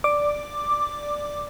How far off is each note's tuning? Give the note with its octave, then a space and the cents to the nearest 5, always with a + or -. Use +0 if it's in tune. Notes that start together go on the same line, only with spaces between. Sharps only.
D5 +0 D6 +5